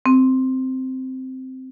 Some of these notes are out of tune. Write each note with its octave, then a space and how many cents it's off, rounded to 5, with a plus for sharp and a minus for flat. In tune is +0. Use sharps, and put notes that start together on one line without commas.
C4 -10